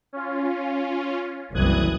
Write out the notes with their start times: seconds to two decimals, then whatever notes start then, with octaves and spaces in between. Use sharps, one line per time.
0.13 C#4 F4
1.55 F#1 C2 E3 D#6 F#6 G#6